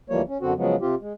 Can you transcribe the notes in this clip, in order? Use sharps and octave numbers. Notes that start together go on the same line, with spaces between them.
D2 E3 F3 G3 A#3 C#5
C#4
F#2 D3 C4 F#4
C#3 F3 F#3 G#3 B3
C3 C4 F4 G4
G#3